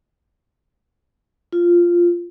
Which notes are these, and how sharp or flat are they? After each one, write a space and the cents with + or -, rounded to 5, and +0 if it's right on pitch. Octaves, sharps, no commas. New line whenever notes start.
F4 -5